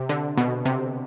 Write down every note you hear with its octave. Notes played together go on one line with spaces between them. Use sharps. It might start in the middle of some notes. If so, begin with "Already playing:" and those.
Already playing: C3
D3
B2
C3